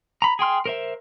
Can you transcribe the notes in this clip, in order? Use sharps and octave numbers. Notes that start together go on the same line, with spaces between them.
A#5 B5
G#4 G5 C6 F6
A#4 C5 E5